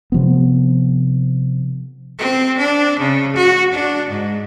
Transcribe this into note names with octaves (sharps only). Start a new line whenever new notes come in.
C3 F3 B3
C4
D4
C#3
F#4
D4
G#2